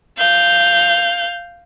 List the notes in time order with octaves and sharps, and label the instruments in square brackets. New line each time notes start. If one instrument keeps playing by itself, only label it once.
[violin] F5 G6